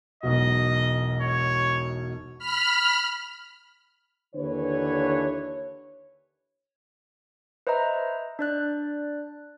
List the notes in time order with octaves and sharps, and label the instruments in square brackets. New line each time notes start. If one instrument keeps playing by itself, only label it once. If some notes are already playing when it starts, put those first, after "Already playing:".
[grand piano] E1 B1 B2 [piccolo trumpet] D#5
[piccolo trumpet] C#5
[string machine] B5 F6
[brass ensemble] D#2 D3 E3 B4 C#5
[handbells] B4 C5 D#5 E5 A#5
D4 D5 F#6